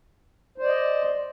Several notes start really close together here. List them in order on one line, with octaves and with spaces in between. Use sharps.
C5 D5 D#5